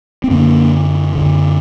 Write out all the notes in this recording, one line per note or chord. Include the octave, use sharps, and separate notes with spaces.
C4
F#2 D3 A#3
F#2 D3